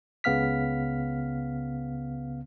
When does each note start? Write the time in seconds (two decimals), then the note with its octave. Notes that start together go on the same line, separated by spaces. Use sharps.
0.24 C#2 C#3 B3 F5 F6 B6